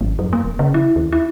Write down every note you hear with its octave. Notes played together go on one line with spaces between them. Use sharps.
G#1
F#2
A#3
E1
C#3
E4
D#2
E4